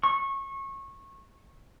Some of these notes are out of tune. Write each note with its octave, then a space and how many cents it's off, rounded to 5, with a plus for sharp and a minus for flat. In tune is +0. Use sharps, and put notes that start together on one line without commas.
C#6 -20